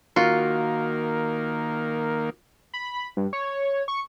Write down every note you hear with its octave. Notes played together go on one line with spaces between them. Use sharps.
D#3 A#3 F4 F#4
B5
G2
C#5
C#6